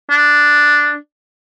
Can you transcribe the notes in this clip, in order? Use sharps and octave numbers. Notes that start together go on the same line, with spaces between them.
D4